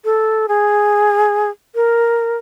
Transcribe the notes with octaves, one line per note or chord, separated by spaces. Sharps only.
A4
G#4
A#4